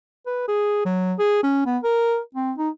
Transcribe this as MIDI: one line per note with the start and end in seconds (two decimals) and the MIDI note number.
0.26 0.48 71
0.48 0.84 68
0.85 1.13 54
1.19 1.41 68
1.43 1.66 61
1.66 1.78 59
1.83 2.19 70
2.35 2.52 60
2.58 2.69 63